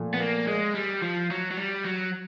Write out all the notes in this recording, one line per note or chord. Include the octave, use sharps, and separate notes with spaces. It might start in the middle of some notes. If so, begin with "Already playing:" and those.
Already playing: A#2 F3 A3
B3
A#3
G#3
G3
F3
F#3
F#3
G3
F#3